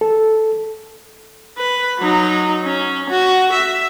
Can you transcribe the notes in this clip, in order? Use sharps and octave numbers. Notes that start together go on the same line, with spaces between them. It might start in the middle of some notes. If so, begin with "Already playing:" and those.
A4
B4
F#3 D#4
C#4
F#4
E5